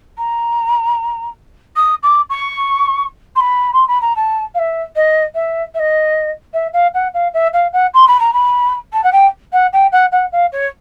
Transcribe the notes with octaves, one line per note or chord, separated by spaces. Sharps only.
A#5
D#6
D6
C#6
C6
B5
C6
B5
A#5
A5
F5
E5
D#5
E5
E5
D#5
E5
F5
F#5
F5
E5
F5
F#5
C6
B5
A#5
B5
A5
F#5
G5
F#5
G5
F#5
F#5
F5
C#5